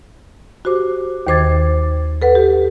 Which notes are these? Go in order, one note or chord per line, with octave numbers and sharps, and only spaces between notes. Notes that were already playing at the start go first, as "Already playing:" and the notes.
F#4 G4 C5 D6
D#2 D#3 C5 D6 G#6 A6
A4 B4 F#5
G4